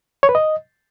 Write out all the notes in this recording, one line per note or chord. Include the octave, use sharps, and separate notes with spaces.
C#5
B4
D#5